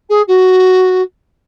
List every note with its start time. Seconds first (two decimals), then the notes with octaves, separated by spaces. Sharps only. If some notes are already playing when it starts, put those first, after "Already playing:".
0.09 G#4
0.27 F#4